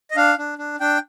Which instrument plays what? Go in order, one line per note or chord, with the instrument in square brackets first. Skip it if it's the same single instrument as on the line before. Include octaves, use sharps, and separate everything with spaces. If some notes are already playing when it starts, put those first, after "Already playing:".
[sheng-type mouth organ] D#5
D4 F5
D4
D4
D4 G5